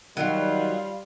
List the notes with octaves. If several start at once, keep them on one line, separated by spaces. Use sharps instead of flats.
D#3 F#3 G3 F4